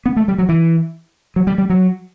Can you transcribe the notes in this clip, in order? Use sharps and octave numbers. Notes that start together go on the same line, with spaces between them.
B3
A3
G3
F#3
E3
F#3
G3
G3
F#3